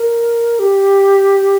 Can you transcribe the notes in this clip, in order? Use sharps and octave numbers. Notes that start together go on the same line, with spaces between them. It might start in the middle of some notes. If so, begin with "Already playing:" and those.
Already playing: A#4
G4